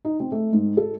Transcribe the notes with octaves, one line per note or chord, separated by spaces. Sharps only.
D#4
C4
A3
G#2
A4